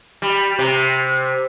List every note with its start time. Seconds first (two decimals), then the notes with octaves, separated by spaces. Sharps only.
0.22 G3
0.59 C3